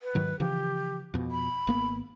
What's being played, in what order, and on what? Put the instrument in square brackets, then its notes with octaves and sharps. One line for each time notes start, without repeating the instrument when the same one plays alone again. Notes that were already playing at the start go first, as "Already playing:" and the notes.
[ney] B4
[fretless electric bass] G#2 D#3 F#3
[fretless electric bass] C#3 E3 F3 [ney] G4
[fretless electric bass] F2 B2
[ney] B5
[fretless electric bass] G#1 A#3 B3